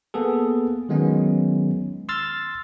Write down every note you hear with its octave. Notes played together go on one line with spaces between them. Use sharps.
A#3 B3 G#4 A4
D#3 F#3 G#3 B3 C#4
C6 E6 F6 A6